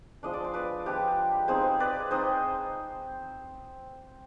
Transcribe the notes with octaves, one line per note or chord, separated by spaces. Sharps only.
F3 G#3 D4 D#5
D5
C5
B4 D5
F3 G#3 D4 G4 B4
G#3 C4 D#4 G#4 C5
B4 D5
G#3 C4 D#4 C5 D#5